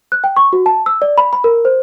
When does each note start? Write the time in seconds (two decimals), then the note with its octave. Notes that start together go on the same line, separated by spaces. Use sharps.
0.12 F#6
0.24 G5
0.37 C#6
0.53 F#4
0.66 A5
0.86 E6
1.02 D5
1.18 B5
1.33 B5
1.44 A#4
1.65 C5